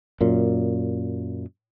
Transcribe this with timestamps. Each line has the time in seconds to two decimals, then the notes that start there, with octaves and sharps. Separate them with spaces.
0.21 F#2 A#2